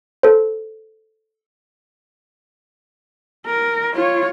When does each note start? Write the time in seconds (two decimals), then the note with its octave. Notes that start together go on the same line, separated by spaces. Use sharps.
0.23 A4 C5
3.46 A#4
3.94 F4 C#5